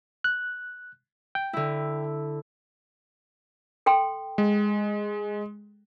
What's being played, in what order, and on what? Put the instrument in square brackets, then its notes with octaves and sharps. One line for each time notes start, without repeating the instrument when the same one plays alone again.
[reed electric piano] F#6
G5
[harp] D3 E4
[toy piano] A4 G5 C6
[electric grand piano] G#3